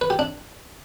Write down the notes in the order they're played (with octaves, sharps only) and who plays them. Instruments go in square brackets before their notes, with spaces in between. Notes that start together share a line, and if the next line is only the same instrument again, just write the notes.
[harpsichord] B4
G4
D4